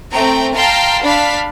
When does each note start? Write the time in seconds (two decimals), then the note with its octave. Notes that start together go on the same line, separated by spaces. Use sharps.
0.12 A3 C4 G5 A#5
0.55 F5 G5 A5 A#5 C6
1.04 D4 F5 B5 B6